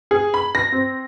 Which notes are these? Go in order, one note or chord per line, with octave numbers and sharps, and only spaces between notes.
G#4
B5
A#6
C4